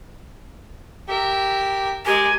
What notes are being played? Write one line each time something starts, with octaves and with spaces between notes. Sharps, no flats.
G4 A#4 E5
G#3 G4 A#4 G#5